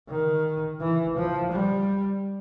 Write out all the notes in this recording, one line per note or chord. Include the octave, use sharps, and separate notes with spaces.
D#3
E3
F3
G3